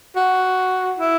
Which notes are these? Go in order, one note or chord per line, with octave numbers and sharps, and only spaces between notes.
F#4
E4